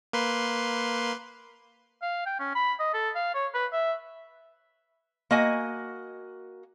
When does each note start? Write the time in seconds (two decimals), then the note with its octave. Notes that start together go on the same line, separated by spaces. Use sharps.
0.13 A#3 B4 C6
2.02 F5
2.26 G5
2.40 C#4
2.55 B5
2.79 D#5
2.94 A4
3.15 F5
3.35 C#5
3.54 B4
3.72 E5
5.31 A#3 F#4 D#5 G#5